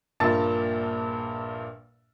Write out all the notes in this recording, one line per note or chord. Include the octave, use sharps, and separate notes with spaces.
A#1 G2 A#2 A#3 A5 A6